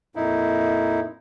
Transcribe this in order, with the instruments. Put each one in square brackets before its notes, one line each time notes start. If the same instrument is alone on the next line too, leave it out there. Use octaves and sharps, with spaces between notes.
[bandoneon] F2 A#2 D#4 E4